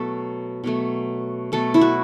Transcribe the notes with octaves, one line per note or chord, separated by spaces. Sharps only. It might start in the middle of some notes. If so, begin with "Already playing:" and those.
Already playing: B2 F#3 A3 A4
B2 F#3 A3
B2 F#3 A3 A4
E4
F#4